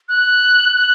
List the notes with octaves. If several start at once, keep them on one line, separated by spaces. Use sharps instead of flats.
F#6
F#6